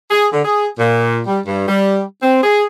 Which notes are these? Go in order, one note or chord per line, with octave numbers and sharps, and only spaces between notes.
G#4
D3
G#4
A#2
G3
G2
G3
C4
G#4